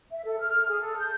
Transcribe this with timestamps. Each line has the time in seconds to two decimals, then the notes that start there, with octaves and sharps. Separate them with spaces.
0.12 E5
0.25 A4
0.40 F6
0.68 G#4
0.81 A4
0.98 G6